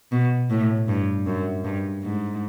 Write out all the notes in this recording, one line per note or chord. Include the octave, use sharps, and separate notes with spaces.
B2
A2
G2
F#2
G2
G#2